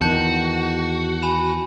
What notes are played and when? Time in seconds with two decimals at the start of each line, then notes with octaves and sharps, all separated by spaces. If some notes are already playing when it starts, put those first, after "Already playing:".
0.01 E2 D#3 F#4 A5 G6 C#7
1.22 G#5 B5 E7